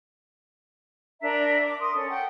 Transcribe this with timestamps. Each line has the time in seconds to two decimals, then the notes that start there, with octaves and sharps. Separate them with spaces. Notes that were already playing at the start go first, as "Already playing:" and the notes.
1.21 D4 A#4 E5 A#5
1.61 D6
1.80 A#4 C6 D#6
1.93 C#4 A4
2.08 F#5 G5